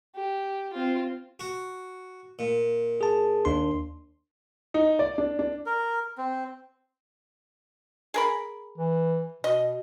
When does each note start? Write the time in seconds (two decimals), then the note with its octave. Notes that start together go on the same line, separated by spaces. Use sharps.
0.16 G4
0.73 C4 F4
1.40 F#4
2.39 A#2
3.01 G#4 A5
3.45 D#2 D4 C6
4.74 D#4
4.99 D5
5.18 D4
5.39 D4
5.66 A#4
6.18 C4
8.14 G#4 A#4 B5
8.77 E3
9.44 B2 D#5